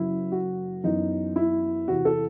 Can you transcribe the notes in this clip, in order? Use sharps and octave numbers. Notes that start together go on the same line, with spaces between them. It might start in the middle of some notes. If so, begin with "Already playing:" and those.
Already playing: F#1 F#2 F#3 E4
F#4
F#2 E3 B3 D#4
E4
E2 C3 E3 F#4
A4